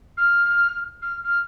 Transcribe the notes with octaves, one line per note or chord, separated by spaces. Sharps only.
F6
F6
F6